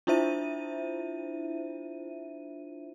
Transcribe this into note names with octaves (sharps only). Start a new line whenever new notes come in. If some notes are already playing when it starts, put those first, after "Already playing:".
D4 E4 F4 C5 E5 D#7